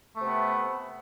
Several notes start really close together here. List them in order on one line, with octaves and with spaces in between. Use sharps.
A3 C3 B3